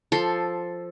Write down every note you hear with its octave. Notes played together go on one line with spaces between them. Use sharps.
F3 A4 C6